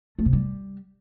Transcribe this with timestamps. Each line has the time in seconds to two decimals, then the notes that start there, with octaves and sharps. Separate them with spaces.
0.19 A3
0.26 C3
0.33 G3